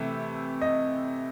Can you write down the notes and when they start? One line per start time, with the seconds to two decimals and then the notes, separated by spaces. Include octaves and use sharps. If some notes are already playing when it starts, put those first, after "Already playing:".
Already playing: C3 E3 A3 E5
0.61 D#5